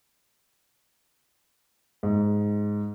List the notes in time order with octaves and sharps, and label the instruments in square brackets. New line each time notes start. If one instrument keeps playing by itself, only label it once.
[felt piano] G#2